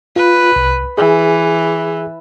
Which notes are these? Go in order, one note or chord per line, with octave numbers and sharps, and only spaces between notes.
F4 B4
C2
E3 G#4